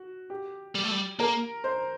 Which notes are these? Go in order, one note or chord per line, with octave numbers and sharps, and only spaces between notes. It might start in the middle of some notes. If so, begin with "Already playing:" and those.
Already playing: F#4
G4
G3
A3
G3
A#3 A#4
C5